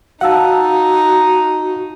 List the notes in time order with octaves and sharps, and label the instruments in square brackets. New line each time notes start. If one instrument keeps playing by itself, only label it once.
[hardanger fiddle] D#4 [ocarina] F#4 [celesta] F5 E6 [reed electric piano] F#5 A5